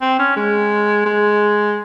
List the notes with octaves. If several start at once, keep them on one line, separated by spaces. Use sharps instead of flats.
C4
C#4
G#3
G#3